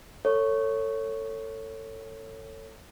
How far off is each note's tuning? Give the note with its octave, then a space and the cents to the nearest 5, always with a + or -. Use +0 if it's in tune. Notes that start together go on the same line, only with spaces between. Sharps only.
A4 +30 C#5 +0